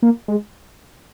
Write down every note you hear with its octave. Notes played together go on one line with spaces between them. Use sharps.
A#3
G#3